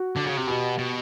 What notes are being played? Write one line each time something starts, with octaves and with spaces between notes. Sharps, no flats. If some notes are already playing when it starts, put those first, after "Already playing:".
Already playing: F#4
D3
C#3
C3
B2 G4
B2